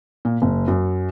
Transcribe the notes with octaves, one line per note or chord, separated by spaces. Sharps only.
A#2
F#1
F#2